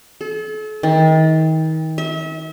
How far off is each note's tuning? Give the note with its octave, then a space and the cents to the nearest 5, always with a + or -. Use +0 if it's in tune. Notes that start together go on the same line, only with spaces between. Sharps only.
A4 -40
D#3 +35
E5 -35